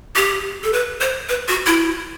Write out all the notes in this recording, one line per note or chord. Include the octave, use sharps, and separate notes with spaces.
G4
A4
B4
C5
B4
F#4
E4